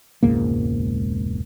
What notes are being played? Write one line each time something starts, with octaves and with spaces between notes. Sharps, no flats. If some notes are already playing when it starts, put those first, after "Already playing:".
E1 C#2 G#2 A#3